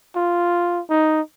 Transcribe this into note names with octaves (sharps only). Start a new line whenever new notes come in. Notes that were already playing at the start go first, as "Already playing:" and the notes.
F4
D#4